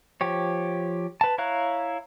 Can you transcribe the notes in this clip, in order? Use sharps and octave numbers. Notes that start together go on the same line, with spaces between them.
F3 G4 C#5
B4 A5
E4 C#5 F5 A#5 F#6